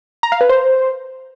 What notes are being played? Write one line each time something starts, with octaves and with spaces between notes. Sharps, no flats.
A#5
F5
B4
C5